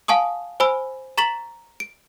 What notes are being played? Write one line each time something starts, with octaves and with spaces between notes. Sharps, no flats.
F5 G#5 A5 C#6 D#6
C5 G#5 B5 E6
A#5 C#6 A6 B6 E7 F#7
D7